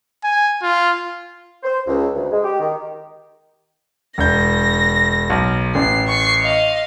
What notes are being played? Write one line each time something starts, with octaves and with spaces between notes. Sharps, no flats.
G#5
F4
C5
C#2
D2
G#3
G4
D#3
E1 G6 A#6
B1
A1 C7
C#6 C7
D#5 F5